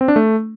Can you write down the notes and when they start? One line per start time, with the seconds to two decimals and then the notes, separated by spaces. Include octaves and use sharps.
0.01 C4
0.08 D4
0.16 A3